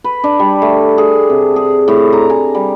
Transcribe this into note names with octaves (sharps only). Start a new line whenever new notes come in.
B4
D4
G3
A3
G#4
C3
G#4
A2
A#5
G#5
G3